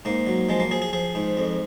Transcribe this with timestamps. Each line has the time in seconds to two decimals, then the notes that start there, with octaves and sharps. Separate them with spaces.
0.05 G#2 A#3
0.27 F#3
0.49 F3 G#3
0.60 A#3
0.71 F3 G#4
0.82 G#4
0.93 F3 G#4
1.15 G#2
1.37 F2